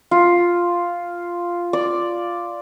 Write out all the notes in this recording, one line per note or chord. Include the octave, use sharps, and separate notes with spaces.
F4
D5